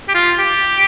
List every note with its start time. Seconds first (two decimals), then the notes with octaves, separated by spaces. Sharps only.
0.08 G4
0.14 F4
0.38 G4